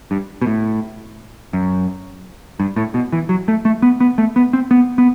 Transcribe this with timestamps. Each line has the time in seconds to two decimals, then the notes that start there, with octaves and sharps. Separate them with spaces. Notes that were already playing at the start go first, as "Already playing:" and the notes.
0.11 G2
0.42 B2
0.47 A2
1.53 F#2
2.60 G2
2.76 A2
2.94 B2
3.12 E3
3.29 F#3
3.48 A3
3.65 A3
3.82 B3
4.00 B3
4.18 A3
4.36 B3
4.53 C4
4.71 B3
4.98 B3